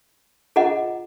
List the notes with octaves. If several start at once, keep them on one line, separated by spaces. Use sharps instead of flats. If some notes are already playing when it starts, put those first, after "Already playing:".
F4 G#4 D#5 F#5 A#5